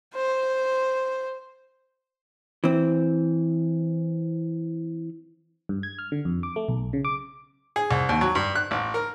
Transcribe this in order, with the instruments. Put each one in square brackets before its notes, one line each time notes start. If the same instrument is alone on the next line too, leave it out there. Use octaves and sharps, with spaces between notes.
[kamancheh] C5
[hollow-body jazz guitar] E3 C4
[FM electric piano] G2
G#6
F6
D3
F2
D6
A3
B1
C#3
D6
[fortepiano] G#4
C2
D#2
F#3
G2
F#6
A1
A#4